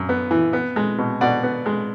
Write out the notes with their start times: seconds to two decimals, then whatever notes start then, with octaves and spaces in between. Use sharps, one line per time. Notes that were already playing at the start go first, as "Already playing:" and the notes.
Already playing: F#2
0.09 B3
0.31 E3
0.53 B3
0.76 G#3
0.98 B2
1.21 B2 D5 F#5
1.43 B3
1.66 G#3